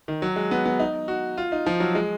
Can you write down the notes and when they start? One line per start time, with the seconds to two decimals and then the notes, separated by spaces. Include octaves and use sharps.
0.08 D#3
0.22 F#3
0.36 G#3
0.51 B3
0.65 B3
0.79 D#4
1.08 F#4
1.38 F4
1.52 D#4
1.66 F3
1.80 F#3
1.95 G#3